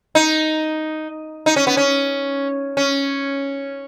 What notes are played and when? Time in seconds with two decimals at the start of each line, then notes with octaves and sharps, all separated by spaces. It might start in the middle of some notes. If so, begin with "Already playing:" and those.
0.15 D#4
1.46 D#4
1.56 C#4
1.67 B3
1.77 C#4
2.77 C#4